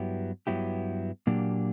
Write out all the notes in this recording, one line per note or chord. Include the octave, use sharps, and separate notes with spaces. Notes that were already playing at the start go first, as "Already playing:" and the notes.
Already playing: G2 F#3 B3 E4 G4
G2 F#3 B3 E4 G4
A#2 F#3 A#3 D4 G4